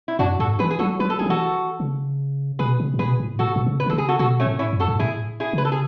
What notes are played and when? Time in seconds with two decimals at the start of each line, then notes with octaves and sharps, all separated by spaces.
0.08 E4
0.19 F#2 D4 F#4
0.39 G#2 F#4 A4
0.59 E3 G#4 B4
0.71 G#4
0.79 F#3 F#4 A4
0.99 F#3 B4
1.10 A4
1.19 F#3 G#4
1.26 E3 F#4 A4
1.80 C#3
2.59 B2 G#4 B4
2.80 C#3
2.94 A2
2.99 B2 G#4 B4
3.20 A2
3.39 A2 F#4 A4
3.56 B2
3.66 C#3
3.80 B4
3.86 D3
3.89 A4
3.93 C#3
3.98 G#4
4.09 F#4 A4
4.19 B2 F#4 A4
4.40 A3 C#4
4.46 A2
4.59 C#4 E4
4.73 F#2
4.80 F#4 A4
4.88 G#2
4.99 A2 E4 G#4
5.40 E4 G#4
5.53 C#3 B4
5.65 A4
5.72 G#4